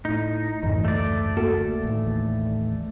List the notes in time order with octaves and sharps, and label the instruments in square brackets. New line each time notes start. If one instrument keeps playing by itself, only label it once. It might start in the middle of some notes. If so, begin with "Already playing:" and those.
[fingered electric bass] A2 [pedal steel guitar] D#4
[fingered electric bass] F#1 D2 [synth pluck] G#2 E3
[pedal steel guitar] A3 D5
[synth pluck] A#3 F#4 A4
[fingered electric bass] A1 D#2